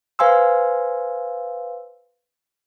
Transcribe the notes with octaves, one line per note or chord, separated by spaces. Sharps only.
B4 C5 F5 G#5 C6 E6